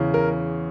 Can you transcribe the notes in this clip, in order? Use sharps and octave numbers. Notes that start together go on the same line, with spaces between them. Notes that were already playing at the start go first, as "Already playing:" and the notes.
Already playing: E2 C#3 E3
A#4